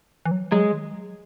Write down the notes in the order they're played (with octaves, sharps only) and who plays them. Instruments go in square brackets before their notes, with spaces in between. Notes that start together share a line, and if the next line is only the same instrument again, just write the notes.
[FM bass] E3
F#3
[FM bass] F#3 [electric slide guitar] G#3
[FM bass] D#3
F#3